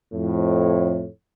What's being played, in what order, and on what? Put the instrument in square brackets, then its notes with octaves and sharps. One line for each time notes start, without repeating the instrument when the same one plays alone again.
[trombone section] F2 A2